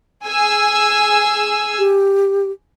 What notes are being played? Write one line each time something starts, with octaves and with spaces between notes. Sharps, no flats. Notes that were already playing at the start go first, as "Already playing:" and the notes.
G#4 G#5 E6
G4